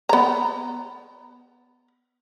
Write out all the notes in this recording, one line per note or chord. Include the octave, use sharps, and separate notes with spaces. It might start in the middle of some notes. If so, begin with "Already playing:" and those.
B3 A#5